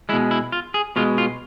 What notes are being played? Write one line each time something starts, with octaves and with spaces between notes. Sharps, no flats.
B2 G#3 E4
E4
F4
G#4
B2 G#3 F4
F4